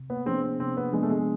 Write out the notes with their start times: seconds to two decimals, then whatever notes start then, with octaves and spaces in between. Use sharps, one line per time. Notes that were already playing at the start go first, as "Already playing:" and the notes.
Already playing: C3
0.10 B3
0.26 F3 B3 C4 D4 G#4
0.43 C4
0.59 C3 C4
0.77 B3
0.93 F3 G#3 B3 D4 G#4
1.03 A3
1.09 G#3